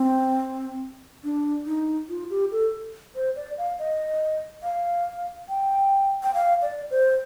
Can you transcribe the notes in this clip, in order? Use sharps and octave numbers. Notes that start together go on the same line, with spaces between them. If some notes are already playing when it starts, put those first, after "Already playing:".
Already playing: C4
D4
D#4
F4
G4
A4
C5
D5
F5
D#5
F5
G5
G5
F5
D5
C5